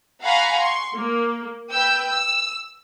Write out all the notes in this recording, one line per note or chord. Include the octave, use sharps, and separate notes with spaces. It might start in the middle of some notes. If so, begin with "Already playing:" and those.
F5 F#5 G#5 A#5 B5 C#6
C6 C#6
A#3
B4 G5 E6 G6
E6